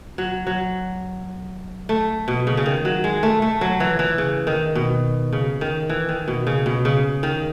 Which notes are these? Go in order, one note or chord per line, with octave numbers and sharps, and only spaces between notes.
F#3
F#3
A3
B2
C#3
C#3
D#3
F#3
G#3
A3
A3
F#3
E3
E3
C#3
D#3
B2
C#3
D#3
E3
D#3
B2
C#3
B2
C#3
D#3